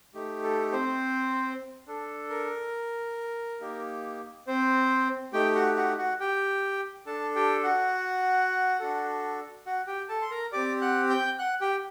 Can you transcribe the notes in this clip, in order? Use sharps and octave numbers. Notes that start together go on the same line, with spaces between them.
A3 D#4 G4
A4
C4 C5
D4 A4
A#4
A#3 D#4 G4
C4 C5
A3 D#4 G4 G5
F#4 F#5
F#4 F#5
F#4 F#5
G4 G5
D4 A4 A5
G4 G5
F#4 F#5
D4 F#4 A4
F#4 F#5
G4 G5
A4 A5
C6
A#4 A#5
C4 G4 D5 D6
F#5 F#6
G5 G6
F#5 F#6
G4 G5